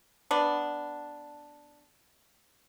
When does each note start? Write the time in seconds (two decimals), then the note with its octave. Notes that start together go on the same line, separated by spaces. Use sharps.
0.31 B3 D4